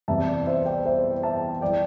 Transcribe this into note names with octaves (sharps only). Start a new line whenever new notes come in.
E2 C3 G3 E5 A5
D5
C5 E5
D5 G5
C5 E5
E5 A5
E3 G3 D5 G5